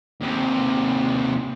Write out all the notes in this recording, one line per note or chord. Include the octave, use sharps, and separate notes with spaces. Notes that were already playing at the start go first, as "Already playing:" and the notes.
D#2 C3